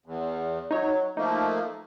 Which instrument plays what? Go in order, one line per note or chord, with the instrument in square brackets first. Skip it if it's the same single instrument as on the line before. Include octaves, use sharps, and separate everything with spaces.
[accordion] E2
[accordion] F#3 [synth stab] D#4 C#5
[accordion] F3 A3 A#3 [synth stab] D#4